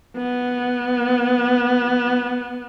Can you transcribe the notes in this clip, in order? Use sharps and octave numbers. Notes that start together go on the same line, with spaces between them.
B3